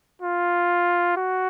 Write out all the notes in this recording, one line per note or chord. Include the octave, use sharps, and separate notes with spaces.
F4
F#4